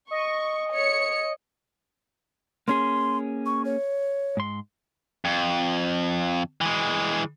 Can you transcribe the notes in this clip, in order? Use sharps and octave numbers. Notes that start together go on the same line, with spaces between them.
D#5 C#6
C#5 C#7
A#3 C#4 G#4 C6
C#6
C#5
G#2 C6
F2
E3 G#3